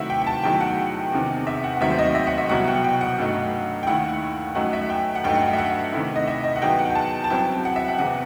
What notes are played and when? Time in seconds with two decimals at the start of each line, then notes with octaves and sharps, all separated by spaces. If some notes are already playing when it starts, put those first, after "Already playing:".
Already playing: C3 D#3 F#3 A3 E4 E5 F#5
0.10 G5
0.22 G5
0.27 A5
0.44 E2 D#3 F#3 A3 E4 G5
0.60 F#5
1.12 E2 C3 D#3
1.47 E5
1.64 F#5
1.76 F#5
1.80 D#2 D#3 F#3 A3 C4 E5
1.90 C5
1.99 D#5
2.15 E5
2.27 F#5
2.38 E5
2.49 C2 B2 F#3 B3 E4 F#5
2.67 G5
2.84 G5
3.01 F#5
3.18 G2 F#3 A3 D#4
3.83 G5
3.87 D#2 D#3 A3 E4 F#5
4.55 F#2 F#3 A3 D#4 F#5
4.73 E5
4.90 G5
5.15 F#5
5.24 G2 F#3 A3 D#4 G5
5.35 F#5
5.47 G5
5.53 E5
5.58 F#5
5.93 C3 D#3 A3 E4
6.16 D#5
6.27 E5
6.44 D#5
6.56 F#5
6.62 E2 D#3 F#3 B3 G5
6.79 F#5
6.90 G5
6.95 A5
7.24 A5
7.30 F#2 F#3 C4 E4 G5
7.65 F#5
7.76 E5
7.88 F#5
7.98 E2 C3 E3 F#5